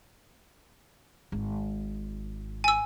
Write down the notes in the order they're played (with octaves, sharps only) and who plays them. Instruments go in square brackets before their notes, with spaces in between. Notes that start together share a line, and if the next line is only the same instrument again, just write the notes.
[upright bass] G#1
[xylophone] G#5 E6